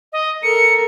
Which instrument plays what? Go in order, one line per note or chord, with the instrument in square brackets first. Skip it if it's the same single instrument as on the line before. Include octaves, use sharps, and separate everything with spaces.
[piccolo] D#5
[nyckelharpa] A4 A#4 [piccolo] C#7